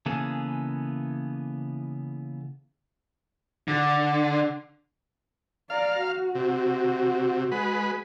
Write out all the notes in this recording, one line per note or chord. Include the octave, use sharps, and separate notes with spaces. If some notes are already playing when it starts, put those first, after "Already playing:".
C#3 E3 A#3 B3 G#4 A4
D3
D5 F5 A#5
F#4
C3
G#3 B4